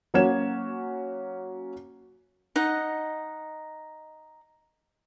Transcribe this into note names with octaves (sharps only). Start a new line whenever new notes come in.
F#3 A#3 C#4 F#4 G#6 E7
D#4 D#5 F#5